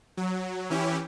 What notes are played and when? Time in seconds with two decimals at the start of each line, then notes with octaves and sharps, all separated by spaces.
0.17 F#3
0.70 E3 C#4 E4 G4